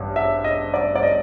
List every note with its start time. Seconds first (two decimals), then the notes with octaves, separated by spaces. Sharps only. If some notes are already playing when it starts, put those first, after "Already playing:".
Already playing: A1 G2
0.16 E5
0.44 D#5
0.74 D5
0.95 D5
1.03 D#5